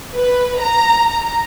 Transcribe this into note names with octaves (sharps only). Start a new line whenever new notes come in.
B4
A#5
A#5